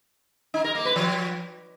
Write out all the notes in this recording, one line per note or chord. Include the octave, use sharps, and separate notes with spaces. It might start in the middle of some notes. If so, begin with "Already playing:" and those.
D#4
A#4
A#3
B4
F3